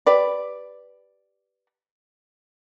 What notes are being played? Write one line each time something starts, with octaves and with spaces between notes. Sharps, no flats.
G4 B4 D5